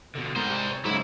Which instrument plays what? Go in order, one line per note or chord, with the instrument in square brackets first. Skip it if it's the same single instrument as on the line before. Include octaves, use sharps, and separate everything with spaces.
[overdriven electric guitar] B2 D3
[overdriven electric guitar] G#2 [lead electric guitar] G3 C5 [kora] A#4
[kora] C3
C#5
[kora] G#2 G#4 [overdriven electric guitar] C#3 F#3 [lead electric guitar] E4